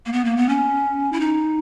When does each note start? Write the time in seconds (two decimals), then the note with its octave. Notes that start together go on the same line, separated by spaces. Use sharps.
0.06 A#3
0.13 B3
0.25 A#3
0.37 B3
0.49 C#4
1.13 E4
1.21 D#4